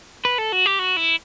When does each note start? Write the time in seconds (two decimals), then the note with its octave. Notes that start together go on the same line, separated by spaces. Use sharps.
0.25 B4
0.38 A4
0.52 F#4
0.66 G4
0.79 F#4
0.97 E4